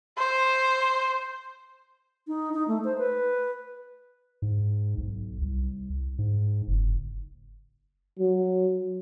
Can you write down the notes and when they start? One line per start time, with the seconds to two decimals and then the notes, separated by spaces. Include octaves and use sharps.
0.18 C5
2.28 D#4
2.54 D#4
2.68 A3
2.84 C5
2.98 B4
4.42 G#2
4.98 B1
5.42 C2
6.19 G#2
6.68 F#1
8.19 F#3